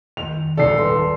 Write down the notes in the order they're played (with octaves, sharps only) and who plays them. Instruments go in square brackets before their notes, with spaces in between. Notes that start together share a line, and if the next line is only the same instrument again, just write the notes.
[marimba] D#3 [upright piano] F7
[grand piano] D#1 G#1 A4 [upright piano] D5 C7
[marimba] B4 C6